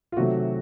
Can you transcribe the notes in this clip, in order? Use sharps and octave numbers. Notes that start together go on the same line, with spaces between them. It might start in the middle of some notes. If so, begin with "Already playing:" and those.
F4
C3 D#3 F#3 A3 F#4